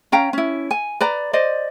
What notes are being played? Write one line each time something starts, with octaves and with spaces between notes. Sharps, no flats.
C#4 F5 G5 A#5
C#4 E4
G#5
B4 D5 A#5
C5 D5 D#5